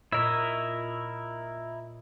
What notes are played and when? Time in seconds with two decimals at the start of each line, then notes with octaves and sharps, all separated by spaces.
0.12 A#2 E4 A#4 C#5 D#5 E5 E6